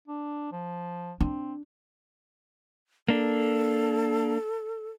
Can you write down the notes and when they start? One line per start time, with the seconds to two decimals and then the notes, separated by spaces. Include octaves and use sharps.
0.08 D4
0.52 F3
1.21 C4 D4
3.09 A#3 D4 A4